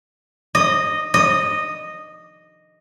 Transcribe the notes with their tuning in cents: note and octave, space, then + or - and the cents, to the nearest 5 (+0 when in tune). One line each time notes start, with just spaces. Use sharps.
D#5 -10
D#5 -10